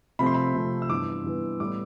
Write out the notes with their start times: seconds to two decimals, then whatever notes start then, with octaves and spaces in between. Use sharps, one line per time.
0.19 C3 F3 A3 C4 B5
0.26 C6
0.34 B5
0.54 C3 F3 A3 C4
0.82 E6
0.89 G2 E3 B3 D6
1.24 G2 E3 B3
1.60 A2 G3 B3 D6